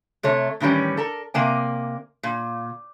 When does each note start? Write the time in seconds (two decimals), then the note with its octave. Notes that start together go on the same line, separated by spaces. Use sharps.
0.23 C3 A3 C#5
0.60 A2 D#3 E3 G3 C#4
0.97 A4 A#4
1.34 C3 A#3 D5 G#5
2.23 A#2